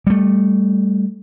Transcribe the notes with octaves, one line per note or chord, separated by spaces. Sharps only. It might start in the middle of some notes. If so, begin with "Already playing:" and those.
G3 A3